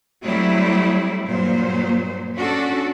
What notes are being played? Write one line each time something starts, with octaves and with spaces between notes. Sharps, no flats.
F#3 G3 A3 C4 E4
G2 A#2 F#3 C5
C#4 D4 F#4 A4